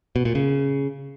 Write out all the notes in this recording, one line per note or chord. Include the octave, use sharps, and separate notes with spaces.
B2
A#2
C#3